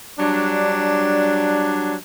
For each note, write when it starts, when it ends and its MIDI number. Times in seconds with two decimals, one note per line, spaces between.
0.19 1.95 54
0.19 1.95 55
0.19 1.95 62